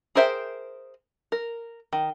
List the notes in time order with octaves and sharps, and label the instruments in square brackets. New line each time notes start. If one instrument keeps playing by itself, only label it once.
[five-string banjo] G#4 A#4 C5 E5 G5
A#4
D#3